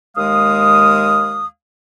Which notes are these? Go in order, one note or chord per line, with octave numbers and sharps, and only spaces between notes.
D#2 G#3 F5 D#6